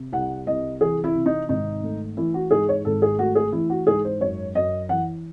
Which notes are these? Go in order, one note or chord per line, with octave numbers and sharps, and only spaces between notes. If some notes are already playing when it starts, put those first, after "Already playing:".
Already playing: C3
C2 F#5
C2 D#5
E3 G#4
E4
C3
D#4
G#1 D#4
A3
E3 E4
F#4
G#2 G#4
C#5
G#1 A4
G#4
A3 F#4
G#4
E3 E4
F#4
G#2 G#4
C5
F#2 C#5
F#2 D#5
E3 F#5